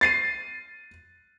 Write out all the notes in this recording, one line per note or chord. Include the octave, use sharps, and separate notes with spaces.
A6 C7 D#7